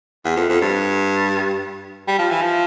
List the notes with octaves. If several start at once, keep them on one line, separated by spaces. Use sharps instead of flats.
E2
F2
F2
G2
G3
F3
E3
F3